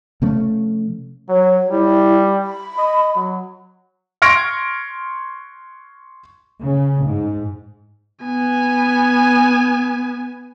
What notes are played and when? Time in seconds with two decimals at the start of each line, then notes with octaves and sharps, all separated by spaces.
0.22 C3 F3 A3 C#4
1.29 F#3 C#5
1.71 G3 E4
2.42 B5
2.79 D#5
3.15 F#3
4.22 C6 C#6 F6 G#6 A#6 D7
6.61 C#3
7.05 G#2
8.25 B3 G#5